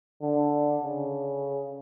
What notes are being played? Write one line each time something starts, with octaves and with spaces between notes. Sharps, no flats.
D3
C#3